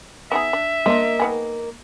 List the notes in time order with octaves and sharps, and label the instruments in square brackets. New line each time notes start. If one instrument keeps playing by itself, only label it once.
[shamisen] B3 D#4 G#4 [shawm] E5
[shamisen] D4
[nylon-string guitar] A#3 D#5 [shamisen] D4 C5
[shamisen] D#3 B3 G#4